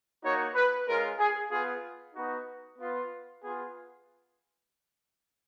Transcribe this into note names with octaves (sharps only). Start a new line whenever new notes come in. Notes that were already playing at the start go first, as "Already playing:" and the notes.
A#3 D#4 F#4 C#5
B4
G#3 C#4 F4 A#4
G#4
B3 F4 G#4
B3 D#4 F#4
B3 F4
B3 F4 G#4